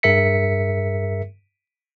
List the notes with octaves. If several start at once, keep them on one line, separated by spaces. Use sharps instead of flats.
G2 G#4 A#4 E5 B6 C#7